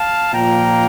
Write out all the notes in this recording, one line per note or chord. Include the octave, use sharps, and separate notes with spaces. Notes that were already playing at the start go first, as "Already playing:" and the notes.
Already playing: F5 A5
A#2 F3 A#3 G5 A#5